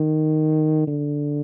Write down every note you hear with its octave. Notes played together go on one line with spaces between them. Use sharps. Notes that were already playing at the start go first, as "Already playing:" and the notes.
Already playing: D#3
D3